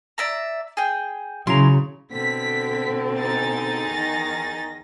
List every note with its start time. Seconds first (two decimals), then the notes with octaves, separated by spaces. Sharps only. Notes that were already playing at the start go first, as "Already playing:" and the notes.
0.18 D5 E5 A#5
0.77 G#4 G5
1.47 C#3 F#3 E4 A#5 C6
2.11 B2 D3 C4 B6
3.15 D#4 G#4 A6
3.88 E2 D#3 A#6